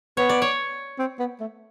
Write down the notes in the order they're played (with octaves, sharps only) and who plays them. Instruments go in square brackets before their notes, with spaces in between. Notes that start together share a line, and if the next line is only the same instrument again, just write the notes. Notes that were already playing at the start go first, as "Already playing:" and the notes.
[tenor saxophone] B3 [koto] C#5
[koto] D5
C#5
[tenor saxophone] C4
B3
A3